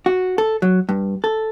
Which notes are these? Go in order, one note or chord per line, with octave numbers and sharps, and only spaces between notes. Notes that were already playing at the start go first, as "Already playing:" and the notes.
F#4
A4
F#3
G2
A4